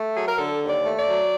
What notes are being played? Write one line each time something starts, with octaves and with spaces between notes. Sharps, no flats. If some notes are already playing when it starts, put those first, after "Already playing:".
Already playing: A3
F#3 G#4
A#4
D3 A4
D#2
D5
A3
D5
F#3